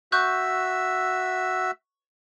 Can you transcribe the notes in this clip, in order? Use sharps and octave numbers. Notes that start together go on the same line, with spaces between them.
F#4 E5 C#6 E6 F#6 G6